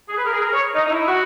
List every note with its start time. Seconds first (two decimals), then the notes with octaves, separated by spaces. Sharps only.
0.09 G#4
0.17 B4
0.26 A#4
0.33 G#4
0.42 A#4
0.53 C#5
0.75 D#4
0.87 D#4
0.91 E4
1.08 F#4